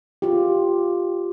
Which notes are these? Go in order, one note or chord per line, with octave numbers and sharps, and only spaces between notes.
F4 G4